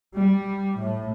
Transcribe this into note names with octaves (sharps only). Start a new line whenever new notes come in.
G3
A2